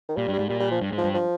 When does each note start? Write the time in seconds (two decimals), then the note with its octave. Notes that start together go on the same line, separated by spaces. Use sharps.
0.09 D#3
0.17 A#2 G3
0.28 G2 G3
0.39 G#2
0.50 A#2 G3
0.60 G3
0.72 F3
0.81 G2
0.92 G#2
0.98 F3
1.04 G2
1.14 F3